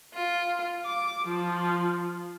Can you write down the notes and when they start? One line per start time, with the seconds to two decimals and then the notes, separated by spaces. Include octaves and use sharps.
0.13 F4
0.85 D6
1.26 F3